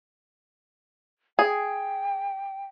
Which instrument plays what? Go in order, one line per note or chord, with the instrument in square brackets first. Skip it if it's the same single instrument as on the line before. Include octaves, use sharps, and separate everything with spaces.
[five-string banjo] G#4 [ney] G5